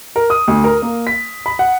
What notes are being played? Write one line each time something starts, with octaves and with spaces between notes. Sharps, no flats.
A#4
D#6
D2
A#4
A#3
B6
B5
F#5